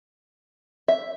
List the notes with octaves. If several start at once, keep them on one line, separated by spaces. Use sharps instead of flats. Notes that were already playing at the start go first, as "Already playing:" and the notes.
E5